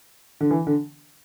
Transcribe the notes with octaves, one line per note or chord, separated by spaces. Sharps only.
D3
E3
D3